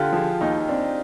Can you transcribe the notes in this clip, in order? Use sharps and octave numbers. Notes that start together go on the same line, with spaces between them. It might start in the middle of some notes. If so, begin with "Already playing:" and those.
Already playing: D3 F4 G4
F3 G#4
D#2 D#4
C4 D4